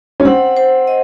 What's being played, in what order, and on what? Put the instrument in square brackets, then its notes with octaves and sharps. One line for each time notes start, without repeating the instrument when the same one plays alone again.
[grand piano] C#4
[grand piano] C4 [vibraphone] F#5
[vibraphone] C5
D#5